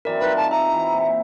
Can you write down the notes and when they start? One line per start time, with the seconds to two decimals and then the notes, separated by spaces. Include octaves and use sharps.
0.05 E3 F#3 C4 A#4 D5
0.20 G3 D#4 F4 B4
0.36 F4 G#4 A5
0.51 E5 A#5
0.68 C3 E3
0.94 A#2